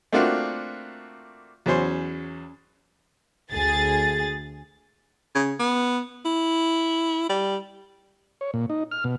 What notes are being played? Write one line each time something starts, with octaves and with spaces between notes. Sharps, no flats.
A3 A#3 C4 D4 F4 F#4
E2 F#3 C#4 C5
D2 G#4 A6
C#3
B3
E4
G3
C#5
A#2
D#4
F6
B2